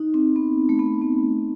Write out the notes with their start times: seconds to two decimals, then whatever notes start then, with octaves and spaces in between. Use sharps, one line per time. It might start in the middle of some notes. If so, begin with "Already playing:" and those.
Already playing: D#4
0.14 C4
0.36 B3
0.69 A3
0.79 B3
1.02 B3